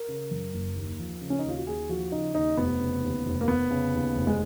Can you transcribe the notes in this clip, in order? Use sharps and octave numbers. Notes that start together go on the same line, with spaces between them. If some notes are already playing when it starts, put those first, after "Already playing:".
Already playing: A#4
C#3
F#2
F#1
D#2
F3
C#3
C#4
D#4
D#2 F4
F#4
D#2 G#4
F3 F#4
C#3 D#4
D#2 D#4
F1 B3
C#3
D#2
F1
A#3
F1 B3
C#3
D#2
F1
G#3